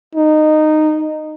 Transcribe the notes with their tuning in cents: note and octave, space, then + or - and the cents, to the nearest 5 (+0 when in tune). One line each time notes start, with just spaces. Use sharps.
D#4 -15